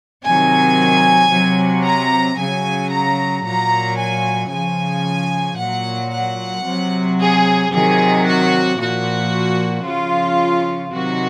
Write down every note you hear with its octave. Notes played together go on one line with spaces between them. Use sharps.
C3 D#3 F#3 G#5
C3 F#3
A#5
C#3 F#3 G#5
A#5
A#2 F#3 A#5
G#5
C#3 F3 G#5
A#2 F#3 F#5
F#5
C3 F#3
G#4
C3 D#3 F#3 G#4
F#4
A#2 F3 F#4
C#3 F3 F4
C3 D#3 F#3 F#4